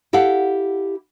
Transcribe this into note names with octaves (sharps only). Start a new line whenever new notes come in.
E4 G4 A4 F5 F#5